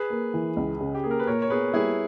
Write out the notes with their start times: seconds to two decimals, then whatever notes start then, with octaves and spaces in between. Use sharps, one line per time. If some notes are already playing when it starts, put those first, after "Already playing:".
Already playing: G#4 B4
0.10 A#3
0.34 E3
0.56 C#2
0.81 C#3
0.94 G4
1.04 A#3 G#4
1.11 A#4
1.19 B4
1.27 A#2 A#4 C#5
1.42 C#5
1.50 B3 G#4 B4
1.73 G3 E4 G#4